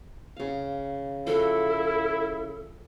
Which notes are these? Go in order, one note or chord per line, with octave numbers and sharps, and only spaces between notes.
C#3 F5
F3 E4 F#4 A4